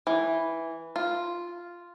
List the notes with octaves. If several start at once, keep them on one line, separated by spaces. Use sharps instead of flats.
E3
F4